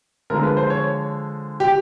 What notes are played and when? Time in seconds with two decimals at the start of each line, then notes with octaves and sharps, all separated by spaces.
0.30 D3 F3 G#3 A#4
0.43 B4
0.57 C5
0.70 C#5
1.60 G4